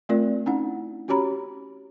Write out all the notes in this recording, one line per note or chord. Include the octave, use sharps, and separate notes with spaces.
A3 C4 F4 A#4 D5
C#4 D#4 E4 F#5
C#4 F#4 G4 C#5 A#5 B5